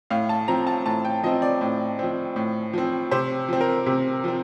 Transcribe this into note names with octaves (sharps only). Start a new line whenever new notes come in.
A2 F5
A5
F3 C4 A#5
A5
A2 A5
G5
F3 C4 D#5
D5
A2
F3 C4
A2
F3 C4
C3 C5
F3 C4
A#4
C3
F3 C4